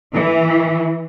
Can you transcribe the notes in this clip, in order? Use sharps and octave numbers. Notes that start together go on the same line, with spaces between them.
E3